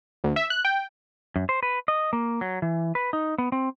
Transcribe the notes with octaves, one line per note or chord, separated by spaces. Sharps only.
D2
E5
F#6
G5
F#2
C5
B4
D#5
A#3
F#3
E3
B4
D#4
B3
C4